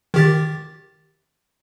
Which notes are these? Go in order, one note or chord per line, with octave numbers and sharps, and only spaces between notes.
D#3 G4 A6